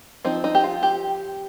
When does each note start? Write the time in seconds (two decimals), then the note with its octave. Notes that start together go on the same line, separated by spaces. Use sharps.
0.25 F3 C4 D#4
0.44 D#4
0.55 G4
0.64 F4
0.83 G4